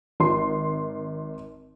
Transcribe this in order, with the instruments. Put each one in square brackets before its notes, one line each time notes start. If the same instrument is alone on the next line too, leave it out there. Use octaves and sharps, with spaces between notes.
[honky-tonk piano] G#1 C6